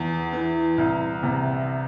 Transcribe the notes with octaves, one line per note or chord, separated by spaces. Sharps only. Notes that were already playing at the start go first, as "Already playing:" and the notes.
Already playing: E2
E3
C2
C3